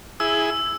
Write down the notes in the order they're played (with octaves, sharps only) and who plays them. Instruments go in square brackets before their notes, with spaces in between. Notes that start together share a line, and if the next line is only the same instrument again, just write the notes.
[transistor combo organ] E4 G#4 [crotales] E6